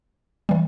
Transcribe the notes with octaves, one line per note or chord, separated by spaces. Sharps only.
E3 G3